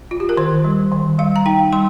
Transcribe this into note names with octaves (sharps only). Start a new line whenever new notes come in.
F4
G4
A#4
D#3 C5
G3
D#3
G3 F5
A#5
D#4 G5
G3 C6